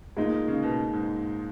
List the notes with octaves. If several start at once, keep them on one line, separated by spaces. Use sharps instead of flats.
A#2 G#3 D#4
C#3
B2
G#2